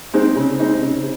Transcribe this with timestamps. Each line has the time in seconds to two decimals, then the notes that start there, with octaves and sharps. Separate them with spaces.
0.14 G#3 C4 D#4
0.36 C#3
0.59 G#3 C4 D#4
0.82 C#3